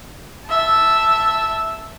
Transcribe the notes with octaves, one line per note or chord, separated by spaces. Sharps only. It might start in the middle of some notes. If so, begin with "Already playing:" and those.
E5 A5